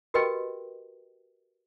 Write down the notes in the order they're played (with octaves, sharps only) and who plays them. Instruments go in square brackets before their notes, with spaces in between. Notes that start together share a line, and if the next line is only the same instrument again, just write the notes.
[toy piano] F#4 G4 A#4 B4 D#5 G5